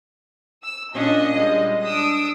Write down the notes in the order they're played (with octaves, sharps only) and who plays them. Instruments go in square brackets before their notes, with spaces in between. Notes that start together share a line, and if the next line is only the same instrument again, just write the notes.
[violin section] E6
[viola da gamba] A#2 C#4 D4 [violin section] D#5
[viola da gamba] G3 G#3
[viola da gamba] D4 [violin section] D#6 E6 D7